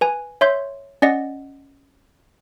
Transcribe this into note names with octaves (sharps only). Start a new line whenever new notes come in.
B4 G#5
C#5 E5 C6 G6
C#4 D5 D#5 F#5 A#6